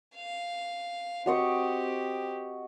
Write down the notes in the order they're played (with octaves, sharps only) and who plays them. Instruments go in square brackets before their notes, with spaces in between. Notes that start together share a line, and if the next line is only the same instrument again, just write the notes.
[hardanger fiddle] F5
[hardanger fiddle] C4 G4 [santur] F#4 D#5 C#6